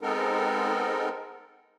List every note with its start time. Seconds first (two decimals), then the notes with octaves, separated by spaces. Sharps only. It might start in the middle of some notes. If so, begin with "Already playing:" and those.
0.01 G#3 B3 C4 D#4 A4 A#4